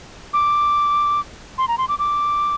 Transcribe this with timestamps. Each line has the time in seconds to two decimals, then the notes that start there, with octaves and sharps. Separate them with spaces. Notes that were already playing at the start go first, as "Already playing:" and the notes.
0.33 D6
1.58 C6
1.68 A#5
1.78 C6
1.88 D6
1.99 D6